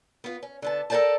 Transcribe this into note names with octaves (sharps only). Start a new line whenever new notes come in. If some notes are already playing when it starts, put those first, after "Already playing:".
B3 F4
C#4
D3 B3 A5
A4 A#4 C5 D5 G5 A5